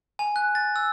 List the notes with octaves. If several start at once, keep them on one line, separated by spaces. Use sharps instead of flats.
G#5
F#6
A6
E6